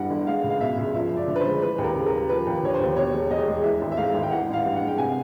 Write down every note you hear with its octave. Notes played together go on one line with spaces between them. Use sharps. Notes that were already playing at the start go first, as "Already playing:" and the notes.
Already playing: G1 G2 E3 F#5
G1
G#3 F5
C#2
F5
B2 E5
C#2
F3 E5
F#2
D5
D3
B4
C5
G#3
E3 B4
D#2
A#4
C#3
A#4
G3
F3 B4
D#2
D3 C#5
C5
D#2
B2 C#5
E1
E2 D#5
G#3
E3 E5
G#1
E5
G#2 F5
G#1
G5
E3 F#5
A1
F5
G2
F#5
G#3
G5
C3 G#5